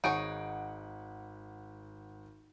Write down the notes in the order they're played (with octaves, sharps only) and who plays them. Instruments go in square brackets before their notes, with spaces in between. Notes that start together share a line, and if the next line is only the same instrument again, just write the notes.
[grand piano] G#1 F#5 D7 [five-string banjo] D#4 G#4 C#5